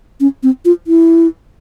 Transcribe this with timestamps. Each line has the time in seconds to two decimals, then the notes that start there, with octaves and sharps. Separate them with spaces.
0.20 C#4
0.43 C4
0.65 F4
0.87 E4